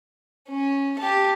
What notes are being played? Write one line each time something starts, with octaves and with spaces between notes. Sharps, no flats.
C#4
G4 A5